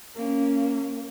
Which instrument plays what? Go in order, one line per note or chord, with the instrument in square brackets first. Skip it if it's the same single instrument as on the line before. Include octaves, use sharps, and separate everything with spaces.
[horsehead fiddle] A#3 C#4